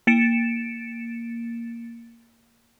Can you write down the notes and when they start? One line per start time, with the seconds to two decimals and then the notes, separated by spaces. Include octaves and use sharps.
0.07 A#3 A6 C#7 D7 E7